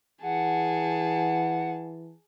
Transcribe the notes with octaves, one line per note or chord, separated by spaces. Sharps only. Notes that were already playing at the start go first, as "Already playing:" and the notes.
E3 G#4 F#5 A5